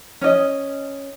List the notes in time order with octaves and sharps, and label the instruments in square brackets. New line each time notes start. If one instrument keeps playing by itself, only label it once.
[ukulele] C#4 D#5